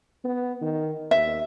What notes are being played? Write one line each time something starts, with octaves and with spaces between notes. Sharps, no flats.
B3
D#3
D#2 E5